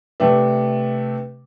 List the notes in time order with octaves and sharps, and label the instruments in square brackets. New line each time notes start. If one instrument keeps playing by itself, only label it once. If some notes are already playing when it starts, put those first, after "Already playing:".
[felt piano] C3 A3 D4 [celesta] B4 E5 G5